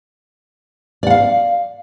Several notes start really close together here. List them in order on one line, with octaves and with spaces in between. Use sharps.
D5 F#5 F5